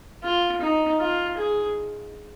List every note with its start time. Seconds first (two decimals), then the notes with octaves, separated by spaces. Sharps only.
0.23 F4
0.61 D#4
1.00 F4
1.37 G#4